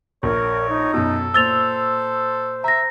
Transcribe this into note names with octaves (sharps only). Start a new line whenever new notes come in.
A#1 A#4 C#5
D#4
F#2 B2 A4
A#2 C5 E6 A6 F7 G7
E5 A#5 A#6